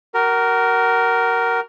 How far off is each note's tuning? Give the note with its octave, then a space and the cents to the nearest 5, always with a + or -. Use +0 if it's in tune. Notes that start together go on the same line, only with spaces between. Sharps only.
F#4 +30 A#4 +0